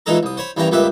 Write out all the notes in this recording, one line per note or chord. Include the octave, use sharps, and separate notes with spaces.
A#2 E3 G#3 D#4 A4 A#5
C2 D#6
C5 C#5 B5
G2 E3 A#3 C#4 G5 A#5
C#2 G2 A#2 G4 B4 E5